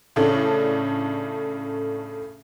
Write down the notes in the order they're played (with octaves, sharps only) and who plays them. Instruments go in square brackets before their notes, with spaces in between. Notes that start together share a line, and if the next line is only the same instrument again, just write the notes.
[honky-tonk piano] A2 C#3 A3 D4